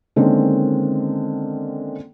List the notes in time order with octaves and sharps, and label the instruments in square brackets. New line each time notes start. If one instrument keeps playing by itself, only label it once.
[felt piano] D3 D#3 G#3 A#3 C4 C#4